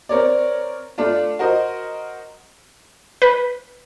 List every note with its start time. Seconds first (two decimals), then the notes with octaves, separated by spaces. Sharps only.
0.09 C4 A#4 C#5 D5
0.98 A3 D4 F4
1.39 F#4 A#4 C5 D#5
3.22 B4